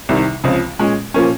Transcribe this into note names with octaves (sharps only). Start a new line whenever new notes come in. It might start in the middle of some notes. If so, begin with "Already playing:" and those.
C2 C3 D#3 G3
C#2 C#3 F3 C4
A#2 G#3 C#4
A#2 F3 A#3 C#4